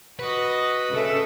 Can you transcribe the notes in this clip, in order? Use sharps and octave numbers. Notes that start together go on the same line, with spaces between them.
F#4 B4 D#5
C#3 A4 E5